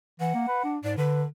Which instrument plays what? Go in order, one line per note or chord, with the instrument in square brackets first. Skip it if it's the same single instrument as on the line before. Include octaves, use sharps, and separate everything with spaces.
[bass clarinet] E3 [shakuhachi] F#5
[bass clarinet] A#3
B4
D4
[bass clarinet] G#2 [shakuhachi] D5
[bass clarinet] D3 [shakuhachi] B4